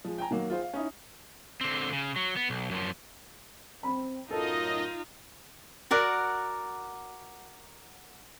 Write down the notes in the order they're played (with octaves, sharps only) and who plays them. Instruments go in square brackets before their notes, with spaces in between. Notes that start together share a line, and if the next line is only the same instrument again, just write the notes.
[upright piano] F3 G#3
G5 G#5 A#5
D#3 F#3 A#3
F4 G#4 C5
F5
C#4 D#4 E4
[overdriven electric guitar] D3 C4
C#3
F#3
B3
B1
F#2 F3
[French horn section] C4 [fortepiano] B5
[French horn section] F#2 A2 A#4 [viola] D#4 F4 [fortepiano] A4 [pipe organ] D#5
[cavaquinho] F#4 A#4 D5 F#5